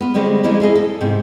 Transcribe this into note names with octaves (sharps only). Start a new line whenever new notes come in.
B3 F4
D3 G3 G#3 C4 C#4
E3 F3 G#3 A#3 D#4 E4
E4 G#4 B4 D#5
A4
G#2 C3